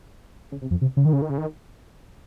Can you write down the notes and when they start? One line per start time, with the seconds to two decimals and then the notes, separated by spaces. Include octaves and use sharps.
0.52 C#3
0.62 C3
0.71 F2
0.82 C3
0.97 C#3
1.05 D#3
1.13 C#3
1.22 D#3
1.30 C#3
1.38 D#3